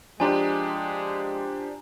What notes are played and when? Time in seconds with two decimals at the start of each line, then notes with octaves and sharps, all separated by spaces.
0.20 F3 G#3 D4 G4 G#5 A#5